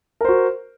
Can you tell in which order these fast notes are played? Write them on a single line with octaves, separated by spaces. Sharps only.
A#4 C5 F#4